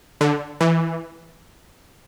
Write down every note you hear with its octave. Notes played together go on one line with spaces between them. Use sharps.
D3
E3